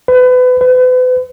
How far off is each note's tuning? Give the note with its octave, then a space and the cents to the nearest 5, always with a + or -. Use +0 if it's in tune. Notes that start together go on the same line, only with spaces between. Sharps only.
B4 +30
B4 +40